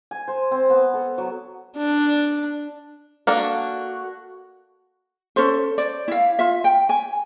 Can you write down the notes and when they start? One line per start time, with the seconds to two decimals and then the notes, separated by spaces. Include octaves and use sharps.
0.11 G#5
0.28 C5
0.51 C4
0.70 B3
0.94 A4
1.18 F#3
1.77 D4
3.27 A#3 D4 F#4 A4
5.36 C#4 A4 C5
5.78 C5 D5
6.08 E4 F5
6.39 F4 E5
6.64 G5
6.89 G#5